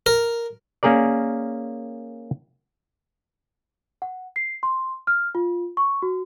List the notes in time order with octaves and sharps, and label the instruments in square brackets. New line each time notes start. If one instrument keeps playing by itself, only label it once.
[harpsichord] A#4
[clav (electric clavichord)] A#3 C#4 G#4 A#4 D5
[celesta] F#5
C7
C6
F6
F4
C#6
F#4